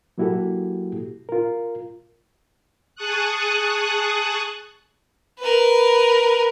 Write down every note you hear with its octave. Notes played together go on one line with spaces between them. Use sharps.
F#3 A#3 E4 F#4 G4 A4
F4 A#4
G#4 A5 C#6 D#6 F#6
A#4 B4